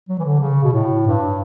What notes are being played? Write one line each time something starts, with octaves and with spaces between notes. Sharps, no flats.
F#3
E3
D3
C#3
B2
A2
G2